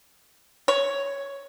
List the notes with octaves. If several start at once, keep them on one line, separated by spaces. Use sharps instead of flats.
C#5